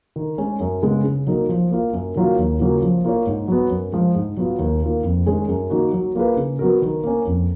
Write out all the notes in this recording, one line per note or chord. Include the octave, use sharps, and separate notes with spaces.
D#3
G#3 C#4
F#2
C#3 G#3 B3
C#3
F#3 A#3 D#4 A#4
F3
A#3 F4
F#2
D#3 F#3 A#3 F4
D#2
C#3 F#3 A#3 F4
F3
A#3 F4 A#4 C#5
G#2
F#3 B3
F#2
F3 G#3
G#2
F#3 B3 F4
D#2
D#3 A#3 F4
F2
D#3 G#3 C#4 G#4
F#2
D#3 A#3 D#4 F#4
F#3
A#3 F4 G#4 B4
C#3
F#3 B3 F#4 A#4
D#3
A#3 C#4
F2